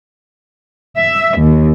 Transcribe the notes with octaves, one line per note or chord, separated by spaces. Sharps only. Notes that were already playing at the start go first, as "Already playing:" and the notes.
E5
D#2